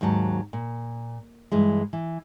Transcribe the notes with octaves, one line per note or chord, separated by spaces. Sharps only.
D#2 G#2 F#3 A5
A#2
G2 E3 G#3
E3